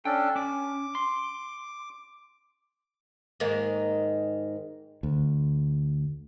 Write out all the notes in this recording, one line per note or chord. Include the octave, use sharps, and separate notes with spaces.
C#4 D4 A4 G5
C#4 D6
C6
G#2 D#3 A#3
D2